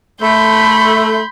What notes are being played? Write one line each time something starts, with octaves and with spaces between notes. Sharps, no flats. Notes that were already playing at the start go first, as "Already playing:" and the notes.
A3 B5 C6 G6